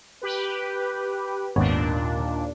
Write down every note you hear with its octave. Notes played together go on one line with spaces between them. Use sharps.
G4 B4
G#1 D#2 A#2 B3 D4 C#5